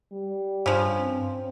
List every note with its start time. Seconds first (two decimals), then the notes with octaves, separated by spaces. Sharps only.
0.12 G3
0.66 G2 C#3 F3
1.00 C4